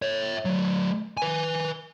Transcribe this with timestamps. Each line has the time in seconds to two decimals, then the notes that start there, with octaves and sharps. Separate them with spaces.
0.02 C#5 E5
0.45 F#3 A3
1.17 B4 G#5